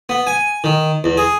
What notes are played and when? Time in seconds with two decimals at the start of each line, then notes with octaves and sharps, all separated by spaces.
0.09 B3
0.27 G#5
0.64 D#3
1.04 E2
1.17 G#4